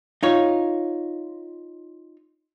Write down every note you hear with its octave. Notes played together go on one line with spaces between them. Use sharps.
D#4 F4 C#5